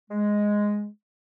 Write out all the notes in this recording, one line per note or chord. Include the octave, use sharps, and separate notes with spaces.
G#3